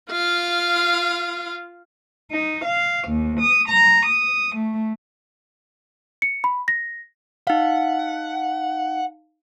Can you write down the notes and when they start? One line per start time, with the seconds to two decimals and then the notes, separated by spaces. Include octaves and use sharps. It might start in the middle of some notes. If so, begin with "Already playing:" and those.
0.11 F4 F5
2.32 D#4
2.64 F5
3.08 D#2
3.40 D#6
3.69 A#5
4.07 D#6
4.57 A3
6.22 C#7
6.44 B5
6.68 A#6
7.47 D#4 F5 F#5